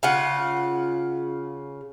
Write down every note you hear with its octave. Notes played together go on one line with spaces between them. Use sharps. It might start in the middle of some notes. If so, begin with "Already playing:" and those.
C#3 F4 F#5